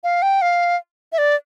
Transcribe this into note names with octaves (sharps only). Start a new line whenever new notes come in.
F5
G5
F5
E5
D5